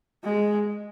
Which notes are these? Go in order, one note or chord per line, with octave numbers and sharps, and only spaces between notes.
G#3